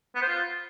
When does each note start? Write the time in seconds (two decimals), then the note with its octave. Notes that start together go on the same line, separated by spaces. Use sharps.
0.15 B3
0.21 C5
0.28 F4